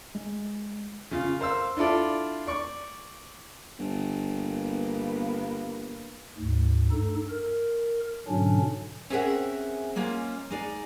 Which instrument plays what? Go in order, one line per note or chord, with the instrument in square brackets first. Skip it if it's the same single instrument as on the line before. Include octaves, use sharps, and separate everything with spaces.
[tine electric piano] G#3
[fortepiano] C#3 F4
A#4 C5 F5 E6
D4 E4 F4 A4 D5
D5 C#6
[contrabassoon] G1
[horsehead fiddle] A#3 B3
[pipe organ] D2 G#2
G2 D#4 A4
A#4
G#2 B2 D3 F#3 C#4 D4
[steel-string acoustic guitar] C4 C#4 G#4 A#4 E5 F#5
G#3 A#3 C#4 F4
G#3 D#4 D5